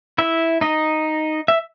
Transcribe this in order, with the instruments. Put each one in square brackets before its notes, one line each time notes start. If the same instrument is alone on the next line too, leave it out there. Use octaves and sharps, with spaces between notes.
[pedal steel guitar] E4 E5
D#4 D#5
E5